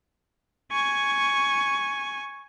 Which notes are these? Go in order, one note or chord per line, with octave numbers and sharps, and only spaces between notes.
G#5 C#6